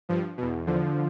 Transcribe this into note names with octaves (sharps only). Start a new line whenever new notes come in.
G2 F3
E2 B2
E2 D3 F3